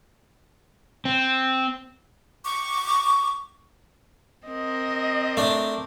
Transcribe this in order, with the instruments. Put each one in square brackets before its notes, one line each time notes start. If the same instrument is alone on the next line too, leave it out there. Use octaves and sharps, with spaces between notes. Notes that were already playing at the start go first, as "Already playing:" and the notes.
[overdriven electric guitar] C4
[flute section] C#6 D6
[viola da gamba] C4 A#4 [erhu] D#5
[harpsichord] A3 D4